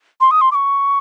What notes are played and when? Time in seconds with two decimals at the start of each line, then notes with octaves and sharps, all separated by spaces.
0.21 C6
0.31 D#6
0.41 C6
0.52 D6
0.55 C#6